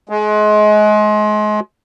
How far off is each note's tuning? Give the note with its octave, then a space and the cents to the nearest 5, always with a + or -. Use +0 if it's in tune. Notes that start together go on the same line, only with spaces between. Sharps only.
G#3 +30